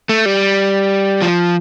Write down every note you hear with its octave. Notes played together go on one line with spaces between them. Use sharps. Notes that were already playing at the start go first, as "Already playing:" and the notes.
A3
G3
F3